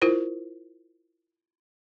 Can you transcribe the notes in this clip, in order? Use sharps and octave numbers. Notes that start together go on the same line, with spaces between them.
E4 F4 A#4 C5